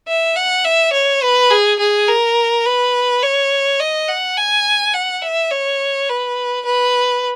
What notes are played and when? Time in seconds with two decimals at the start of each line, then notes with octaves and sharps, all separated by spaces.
0.08 E5
0.36 F#5
0.64 E5
0.93 C#5
1.23 B4
1.50 G#4
1.80 G#4
2.08 A#4
2.66 B4
3.23 C#5
3.80 D#5
4.08 F#5
4.37 G#5
4.94 F#5
5.22 E5
5.51 C#5
6.09 B4
6.65 B4